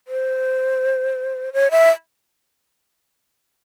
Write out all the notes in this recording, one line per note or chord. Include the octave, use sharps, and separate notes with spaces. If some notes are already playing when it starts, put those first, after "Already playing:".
C5
C#5
E5